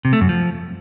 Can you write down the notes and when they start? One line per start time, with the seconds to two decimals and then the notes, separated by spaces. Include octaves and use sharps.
0.05 C3
0.13 A3
0.21 F#2
0.29 F3